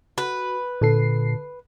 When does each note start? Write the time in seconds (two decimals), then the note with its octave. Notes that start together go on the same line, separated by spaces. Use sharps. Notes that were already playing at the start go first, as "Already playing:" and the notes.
0.18 F#4 B4
0.81 A#2 D3 A4 C7